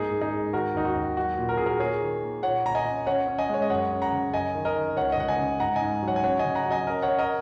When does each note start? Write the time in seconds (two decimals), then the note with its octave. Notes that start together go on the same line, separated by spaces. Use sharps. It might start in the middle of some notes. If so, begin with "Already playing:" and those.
Already playing: G#2 A#3 D#4 G#4
0.11 G#2
0.21 D#4 G#4
0.32 G#2
0.53 D#3 F#4 A#4
0.74 D#2 D#4
0.85 F#4
0.96 D#2
1.17 F#3 F#4
1.38 A#2
1.49 A#4
1.57 A#2 G#4
1.66 F#4 A#4
1.79 A#3 G#4 C#5
2.02 D#3
2.23 A#3
2.43 A#2 C#5 F#5
2.64 A#2 A#5
2.75 D#5 G#5
2.85 C#4
3.07 C#4 C#5 F#5
3.28 C#4
3.38 D#5 G#5
3.49 G#3 C#5
3.62 D#5
3.70 F#2 C#5 F#5
3.91 C#4
4.02 F#5 A#5
4.12 C#3
4.34 F#2 D#5 G#5
4.55 D#3
4.65 A#4 D#5
4.76 D#3
4.97 C#2 C#5 F#5
5.12 D#5
5.17 C#2 F#5
5.28 D#5 G#5
5.39 C#3
5.60 G#2 F#5 A#5
5.76 D#5 G#5
5.81 G#2
6.02 F#3
6.08 C#5 F#5
6.16 G#5
6.23 C#4 C#5 F#5
6.39 D#5 G#5
6.45 C#3
6.55 F#5 A#5
6.65 F#3
6.71 D#5 G#5
6.87 C#4 A#4 D#5
7.02 C#5 F#5
7.08 C#4
7.19 A#4 D#5